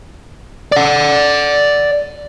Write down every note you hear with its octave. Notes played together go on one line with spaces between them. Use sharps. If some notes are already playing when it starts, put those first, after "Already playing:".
D5 F#5